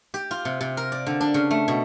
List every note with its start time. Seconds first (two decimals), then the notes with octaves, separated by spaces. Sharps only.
0.14 G4
0.31 F4
0.45 C3
0.61 C3
0.77 A#4
0.92 D5
1.06 D3
1.21 D4
1.34 C#3
1.51 A3
1.68 B2